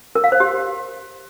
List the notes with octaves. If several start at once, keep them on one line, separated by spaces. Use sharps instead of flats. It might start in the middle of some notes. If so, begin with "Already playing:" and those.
A#4
F5
C5
G4